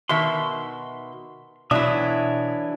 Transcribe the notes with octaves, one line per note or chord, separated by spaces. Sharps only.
B2 D#3 E5 C6
B2 E3 F#3 D4 E4 E5 D#6